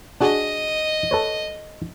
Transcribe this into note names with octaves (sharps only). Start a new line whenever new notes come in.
D4 F#4 G#4 D#5
A4 B4 C#5